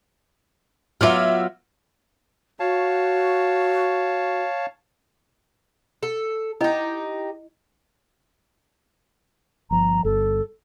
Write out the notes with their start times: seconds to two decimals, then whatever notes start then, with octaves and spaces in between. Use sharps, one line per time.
1.01 F#3 B3 F4 E5 D6 F6
2.60 F#4 C#5 F5 A5
6.03 A4
6.61 D#4 E4 G4 D#5
9.71 G1 F3 A#5
10.05 G1 A4